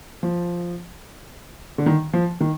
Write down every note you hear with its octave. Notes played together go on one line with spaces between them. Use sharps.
F3
D3
D#3
F3
D#3